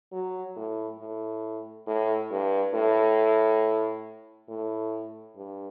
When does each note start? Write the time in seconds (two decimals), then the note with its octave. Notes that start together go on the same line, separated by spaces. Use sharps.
0.12 F#3
0.56 A2
1.00 A2
1.87 A2
2.31 G2
2.75 A2
4.49 A2
5.37 G2